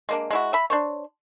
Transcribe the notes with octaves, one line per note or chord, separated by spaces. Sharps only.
G#3 A#3 D4
G#3 E4 F#4
E5 B5
D4 C5 C#5